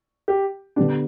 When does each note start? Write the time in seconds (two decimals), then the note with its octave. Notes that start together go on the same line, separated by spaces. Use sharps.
0.28 G4
0.76 D3 B3 D4 G4